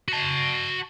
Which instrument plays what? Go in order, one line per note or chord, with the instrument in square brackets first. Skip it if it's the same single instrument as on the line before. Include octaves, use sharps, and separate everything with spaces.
[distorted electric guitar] F#4 A5